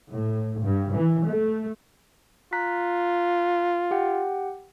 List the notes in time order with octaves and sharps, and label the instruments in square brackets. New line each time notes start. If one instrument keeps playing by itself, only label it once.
[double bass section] A2
G2
E3
A3
[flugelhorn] F4 [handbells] A#5 F#6 B6
[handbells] G4 F#5 G5